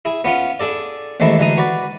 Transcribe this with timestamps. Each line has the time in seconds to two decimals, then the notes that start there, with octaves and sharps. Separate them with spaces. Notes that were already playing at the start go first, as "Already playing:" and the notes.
0.05 E4 G#4
0.24 B3 C#4 F4
0.60 D4 G#4 A4 D5
1.20 A1 D#2 G#3 A3 C4 E4
1.39 D2 E3 G#3 D#4 D#6
1.58 F#4 B4 D5